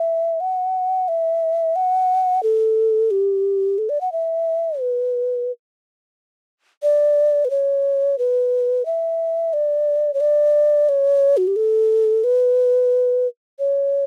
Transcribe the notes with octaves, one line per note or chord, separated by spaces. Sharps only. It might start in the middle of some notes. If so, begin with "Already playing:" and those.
Already playing: E5
F#5
E5
F#5
A4
G4
A4
D5
F#5
E5
B4
D5
B4
C#5
B4
E5
D5
C#5
D5
C#5
F#4
G4
A4
B4
C#5